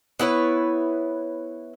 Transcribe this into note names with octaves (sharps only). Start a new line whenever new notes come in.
B3 E4 B4 C#5